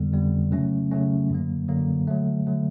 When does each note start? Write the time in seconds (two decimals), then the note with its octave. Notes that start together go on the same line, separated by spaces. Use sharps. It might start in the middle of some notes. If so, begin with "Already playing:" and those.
Already playing: F2 D3 G3 B3
0.13 F2 D3 G3 B3
0.52 C#3 F#3 A3 C#4
0.91 C#3 F#3 A3 C#4
1.30 F#2 D3 F#3 A#3
1.68 F#2 D3 F#3 A#3
2.08 D3 F#3 A3
2.46 D3 F#3 A3